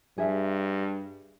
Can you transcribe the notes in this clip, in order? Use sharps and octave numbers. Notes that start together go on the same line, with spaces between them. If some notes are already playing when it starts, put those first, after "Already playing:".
G2 G#4 E5